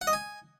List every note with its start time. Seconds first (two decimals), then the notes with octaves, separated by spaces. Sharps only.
0.01 F#5
0.07 D#5
0.13 G#5